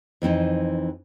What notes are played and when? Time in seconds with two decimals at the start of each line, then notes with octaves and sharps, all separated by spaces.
0.22 F2 E3 C4 D#4